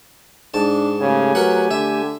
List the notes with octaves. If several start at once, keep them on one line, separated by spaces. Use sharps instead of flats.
G#2 D4 A5
C#3 A3 G4 G#5
F#3 A#4 B4 F#5
D3 E5